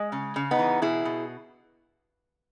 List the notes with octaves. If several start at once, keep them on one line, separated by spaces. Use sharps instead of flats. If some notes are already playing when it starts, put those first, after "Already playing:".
Already playing: G#3
C#3
C#3
B3 D#4
E3
B2 E4 G#4
B2